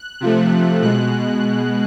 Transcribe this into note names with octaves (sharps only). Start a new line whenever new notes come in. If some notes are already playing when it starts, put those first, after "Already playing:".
Already playing: F#6
C3 F3 A3
B2 G#3 F#6